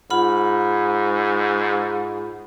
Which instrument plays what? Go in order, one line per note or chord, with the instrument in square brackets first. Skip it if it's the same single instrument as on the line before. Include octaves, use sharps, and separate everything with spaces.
[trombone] G#2 [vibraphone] F4 F#5 B5